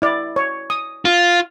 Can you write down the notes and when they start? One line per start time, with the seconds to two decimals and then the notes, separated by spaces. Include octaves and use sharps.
0.02 E4 D5
0.36 C#5
0.70 D#6
1.05 F4